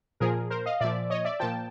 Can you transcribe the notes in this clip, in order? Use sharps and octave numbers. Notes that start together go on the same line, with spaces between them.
A#2 F3 G#4 A#4
A#4 C5
D#5 F5
A#2 F3 D5 E5
C#5 D#5
D5 E5
A#2 F3 G5 A5